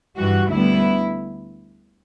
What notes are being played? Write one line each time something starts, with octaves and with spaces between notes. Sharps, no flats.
G2 E3 G3 F#4
D2 D3 G3 B3 E4